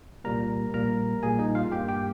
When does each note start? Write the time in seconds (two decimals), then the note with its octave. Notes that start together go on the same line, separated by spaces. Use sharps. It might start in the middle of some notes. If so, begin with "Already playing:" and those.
0.24 C2 A#2 G3 A#3 A#4 A#5
0.73 A#1 A#2 G3 A#3 A#4 A#5
1.23 A#1 A#2 G3 A#3 G#4 G#5
1.39 D#4 D#5
1.55 F4 F5
1.72 G2 G3 A#3 G4 G5
1.88 G4 G5